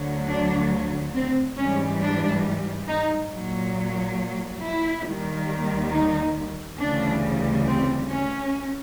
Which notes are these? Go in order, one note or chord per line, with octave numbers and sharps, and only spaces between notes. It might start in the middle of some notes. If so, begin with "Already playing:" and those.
Already playing: D2 D3 F#3
D4
C4
G#2 E3 G3 C#4
D4
D#4
A#2 F#3
E4
D#2 D#3 G3
D#4
D2 C#3 E3 G3 D4
C4
C#4